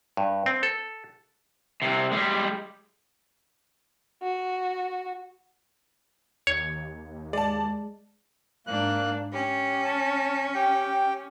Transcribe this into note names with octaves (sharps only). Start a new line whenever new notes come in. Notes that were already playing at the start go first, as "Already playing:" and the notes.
G2
C4
A4
C2 C3
G3 G#3
F#4
D#2 C#5
G#3 D5 A5
G#2 A#3 D4 F#6
C#4 G4
A5
G4 G5